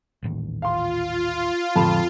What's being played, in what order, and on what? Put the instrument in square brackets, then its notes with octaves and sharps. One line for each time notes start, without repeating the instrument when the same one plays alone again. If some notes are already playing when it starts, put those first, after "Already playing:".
[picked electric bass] D#1 A1 D#2
[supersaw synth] F4 [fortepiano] F5 C6
[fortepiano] F2 A5 B5 [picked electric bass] A2 D3 G#3